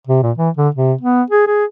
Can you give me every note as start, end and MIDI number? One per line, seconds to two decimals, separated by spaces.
0.07 0.22 48
0.23 0.32 46
0.38 0.50 52
0.57 0.69 50
0.75 0.93 48
1.01 1.23 59
1.30 1.44 68
1.47 1.65 68